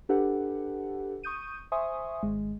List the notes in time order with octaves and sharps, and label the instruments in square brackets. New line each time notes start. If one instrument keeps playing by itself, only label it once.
[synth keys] D4 G4 A4 B4 F#5
C#6 D#6 G6 D#7
C5 E5 G#5 C6 C#6 D#6
G#1 G#3